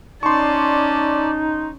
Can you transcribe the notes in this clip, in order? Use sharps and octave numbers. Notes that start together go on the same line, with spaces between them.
C#4 D#4 D5 A5 C6 C#6